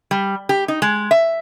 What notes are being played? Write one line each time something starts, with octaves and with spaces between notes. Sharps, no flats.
G3
G4
D#4
G#3
E5